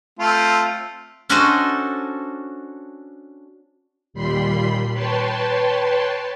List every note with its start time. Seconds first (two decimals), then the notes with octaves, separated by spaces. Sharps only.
0.19 A3 C4 F4
1.30 C#4 D4 F#4 A4 C5 D#5
4.13 D#2 A#2 G3 B5 C6 C7
4.93 B4 C#5 G5 A5 C6